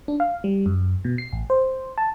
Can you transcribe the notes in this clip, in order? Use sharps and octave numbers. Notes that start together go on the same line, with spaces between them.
D4
F5
G3
F#2
B2
C7
A1
C5
A5